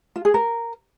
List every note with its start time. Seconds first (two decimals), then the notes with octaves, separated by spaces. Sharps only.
0.16 F4
0.25 G#4
0.34 A#4